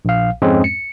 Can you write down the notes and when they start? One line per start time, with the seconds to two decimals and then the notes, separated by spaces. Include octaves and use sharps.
0.05 A#1 F5
0.42 F2 G#2 G#3 C4 C#4
0.64 C#7